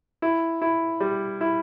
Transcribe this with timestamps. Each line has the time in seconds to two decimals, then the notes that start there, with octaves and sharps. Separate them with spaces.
0.22 E4
0.62 E4
1.00 G3
1.41 E4